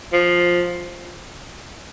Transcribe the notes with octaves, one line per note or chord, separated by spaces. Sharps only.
F3